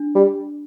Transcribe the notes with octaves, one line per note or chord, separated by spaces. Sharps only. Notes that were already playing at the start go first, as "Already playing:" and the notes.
Already playing: D4
G3